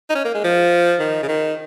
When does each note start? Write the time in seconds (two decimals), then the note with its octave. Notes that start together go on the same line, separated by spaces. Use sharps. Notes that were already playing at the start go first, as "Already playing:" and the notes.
0.09 D#4
0.15 C#4
0.25 A#3
0.35 G#3
0.44 F3
1.00 D#3
1.22 C#3
1.28 D#3